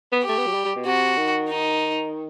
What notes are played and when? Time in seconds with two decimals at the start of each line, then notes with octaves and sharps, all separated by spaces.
0.12 B3
0.23 G4
0.29 A3
0.38 B3
0.47 F#3
0.54 G3
0.65 G3
0.75 B2
0.86 C3 F#4
1.17 D#3
1.49 D#4